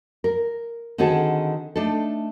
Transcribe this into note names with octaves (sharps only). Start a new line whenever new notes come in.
A#4
D3 D#3 C4 F#4 G#4 A4
A3 D4 D#4 A4